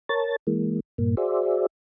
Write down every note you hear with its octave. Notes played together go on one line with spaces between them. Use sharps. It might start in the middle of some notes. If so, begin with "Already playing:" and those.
A#4 C#5 A5 A6
E3 G#3 A#3
G2 A#2 A#3
F#4 G#4 C5 D5 E5